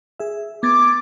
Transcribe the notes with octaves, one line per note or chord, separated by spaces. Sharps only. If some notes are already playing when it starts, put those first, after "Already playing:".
G#4 E5
B3 D6 G#6 A6